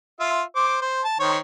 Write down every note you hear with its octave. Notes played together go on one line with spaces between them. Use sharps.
F4 E5
C5 D6
C5
A5
D#3 C5 C#5